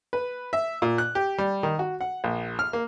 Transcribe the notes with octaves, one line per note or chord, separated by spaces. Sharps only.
B4
E5
A#2
F#6
G4
G3
D#3
F#4
F#5
A#1
F6
A#3